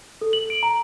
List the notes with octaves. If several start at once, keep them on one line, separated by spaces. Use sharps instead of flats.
A4
F#7
D7
A#5